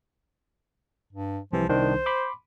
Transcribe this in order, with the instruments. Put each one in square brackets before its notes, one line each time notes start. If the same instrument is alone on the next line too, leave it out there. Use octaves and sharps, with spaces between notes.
[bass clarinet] G2
[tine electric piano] C2 C3 E3 [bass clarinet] F3
[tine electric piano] C2 D#3 D4 [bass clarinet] C5
[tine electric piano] B5 C6 D6